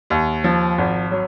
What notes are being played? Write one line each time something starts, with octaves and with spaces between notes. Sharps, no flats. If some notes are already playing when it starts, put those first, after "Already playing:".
D#2
F3
G#1
F#3